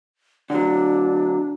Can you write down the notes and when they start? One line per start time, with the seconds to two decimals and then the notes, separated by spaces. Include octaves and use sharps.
0.50 D3 F#3 D4